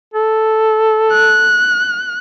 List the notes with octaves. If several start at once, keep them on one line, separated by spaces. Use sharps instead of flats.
A4
F#6